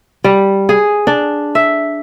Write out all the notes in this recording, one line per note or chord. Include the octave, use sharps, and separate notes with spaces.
G3
G#4
D4
E5